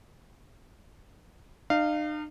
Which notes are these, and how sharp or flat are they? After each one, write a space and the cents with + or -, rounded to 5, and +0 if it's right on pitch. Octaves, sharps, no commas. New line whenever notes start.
D#4 -45 F5 -10